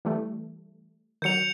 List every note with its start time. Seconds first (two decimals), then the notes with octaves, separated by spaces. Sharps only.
0.05 E3 G3 A3
1.22 D#3 F#3 G6 C#7 F7